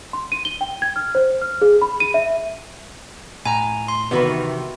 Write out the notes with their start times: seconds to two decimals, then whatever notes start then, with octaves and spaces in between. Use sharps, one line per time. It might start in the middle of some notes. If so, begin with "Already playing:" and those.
0.13 C6
0.32 D#7
0.45 G7
0.61 G5
0.82 G#6
0.96 F6
1.15 C5
1.42 F6
1.62 G#4
1.81 B5
2.00 D#7
2.14 E5
3.45 A2 G#5 A#5
3.88 C6
4.11 C3 D#3 E3 B3 F#4 B4